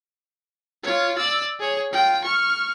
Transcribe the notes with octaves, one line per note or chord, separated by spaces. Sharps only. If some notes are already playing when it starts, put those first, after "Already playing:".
F4 C#5
D5 E6
G#4 C#5
F4 G5
C#6 F6